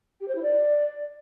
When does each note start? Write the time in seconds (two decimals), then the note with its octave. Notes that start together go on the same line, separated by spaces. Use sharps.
0.20 G4
0.27 C5
0.35 E4
0.42 D5